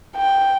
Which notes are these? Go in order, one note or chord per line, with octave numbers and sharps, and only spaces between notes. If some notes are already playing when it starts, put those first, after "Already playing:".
G5